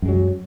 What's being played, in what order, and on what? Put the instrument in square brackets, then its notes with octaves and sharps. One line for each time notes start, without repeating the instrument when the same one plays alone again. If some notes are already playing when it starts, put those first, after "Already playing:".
[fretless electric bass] F#2
G#3
F#3